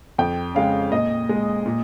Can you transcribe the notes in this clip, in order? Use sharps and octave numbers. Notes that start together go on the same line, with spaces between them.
F2 G5
C#3 G#3 F5
A#2 D#5
G#3
A#2